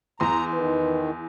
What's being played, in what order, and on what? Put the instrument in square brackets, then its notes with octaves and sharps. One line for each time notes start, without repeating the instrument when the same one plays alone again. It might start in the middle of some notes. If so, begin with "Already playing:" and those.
[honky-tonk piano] E2 C6 [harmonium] A#5
[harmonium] D#3 [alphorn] B4